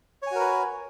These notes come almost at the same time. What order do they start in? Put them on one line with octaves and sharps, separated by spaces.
C#5 G#5 F#4 A#4 B4